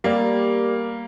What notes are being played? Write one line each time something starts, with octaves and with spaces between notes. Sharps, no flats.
G3 A#3 G4 A#4 D5